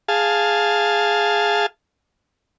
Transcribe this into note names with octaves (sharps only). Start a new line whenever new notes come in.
G#4 F5 A5